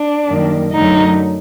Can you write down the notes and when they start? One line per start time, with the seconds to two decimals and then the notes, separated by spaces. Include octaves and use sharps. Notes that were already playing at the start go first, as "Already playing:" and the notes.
Already playing: D4
0.27 F#2 D#3 G3 A#3
0.71 F#2 D3 F#3 A3 D#4